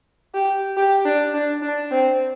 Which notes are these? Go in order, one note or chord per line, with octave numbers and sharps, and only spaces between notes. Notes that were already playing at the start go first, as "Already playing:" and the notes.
G4
G4
D4
D4
D4
C4